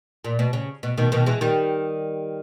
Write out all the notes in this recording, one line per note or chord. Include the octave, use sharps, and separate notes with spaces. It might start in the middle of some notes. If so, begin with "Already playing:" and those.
A#2
B2
C#3
B2
B2 D#3
B2 D#3
E3 G#3
D#3 G3